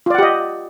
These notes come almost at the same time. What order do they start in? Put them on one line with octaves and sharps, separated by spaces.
F4 D5 F#5 G4 D#5